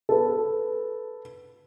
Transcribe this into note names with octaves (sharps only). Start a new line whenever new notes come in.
A4 B4